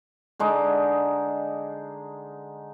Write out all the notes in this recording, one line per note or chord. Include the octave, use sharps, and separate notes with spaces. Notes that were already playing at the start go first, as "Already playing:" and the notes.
D3 G#3 D#4 D6